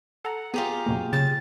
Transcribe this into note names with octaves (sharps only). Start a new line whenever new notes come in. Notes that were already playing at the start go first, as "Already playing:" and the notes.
A4 F#5 A#5
B3 F4 G4 G#4 A#5
F#2 B2 A#3
C#3 G5 A6